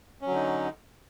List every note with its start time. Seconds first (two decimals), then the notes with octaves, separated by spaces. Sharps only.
0.21 C#4
0.26 F#3
0.30 D3
0.35 D#4